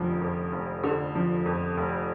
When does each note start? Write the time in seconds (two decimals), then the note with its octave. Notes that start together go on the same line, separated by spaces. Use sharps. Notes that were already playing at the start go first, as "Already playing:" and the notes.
Already playing: F1 F2 D3 F3
0.21 F2
0.52 F1
0.84 D3
1.15 F3
1.46 F2
1.77 F1